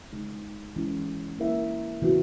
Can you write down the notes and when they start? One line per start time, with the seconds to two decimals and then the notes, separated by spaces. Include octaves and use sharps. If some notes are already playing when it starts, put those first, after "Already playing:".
0.13 C#3 G#3 D#4
0.76 E3 G#3 C#4
1.39 A#3 E4 A#4 E5
2.02 C#3 E3 B3 F#4